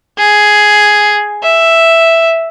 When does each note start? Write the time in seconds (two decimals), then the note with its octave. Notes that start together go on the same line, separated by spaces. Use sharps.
0.18 G#4
1.43 E5